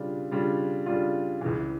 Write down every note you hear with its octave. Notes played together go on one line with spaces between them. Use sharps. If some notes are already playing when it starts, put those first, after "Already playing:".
Already playing: C#3 G3 D4 F4
C#3 G3 D4 F4
C#3 G3 D4 F4
C#2 C#3 E3